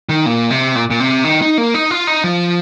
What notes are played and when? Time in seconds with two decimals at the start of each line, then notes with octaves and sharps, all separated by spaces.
0.09 D#3
0.26 A#2
0.50 C3
0.75 A#2
0.91 A#2
1.00 C3
1.24 D#3
1.42 D#4
1.58 A#3
1.74 D#4
1.91 F4
2.07 D#4
2.24 F3